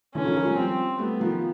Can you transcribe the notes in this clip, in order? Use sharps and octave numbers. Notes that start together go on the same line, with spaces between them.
D3 E3 C#4
D#3 F3
D#3 F3
F3 G3
F3 G3 C4
G3 A3 B3
D#3 F3